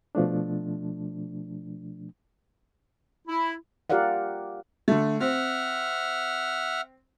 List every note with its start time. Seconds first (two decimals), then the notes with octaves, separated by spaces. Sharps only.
0.15 B2 F3 A3 D4
3.28 E4
3.90 F4 G4 A#4 D5 F5 F#5
4.88 D3 A3
5.20 C4 E5 F#5 F6